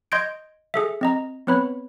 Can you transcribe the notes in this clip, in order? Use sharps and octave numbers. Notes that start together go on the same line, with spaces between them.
D#5 C6 G6 G#6 D7
G#4 A4 E5
C4 D#5 A#5
B3 C4 B4 C#5 B5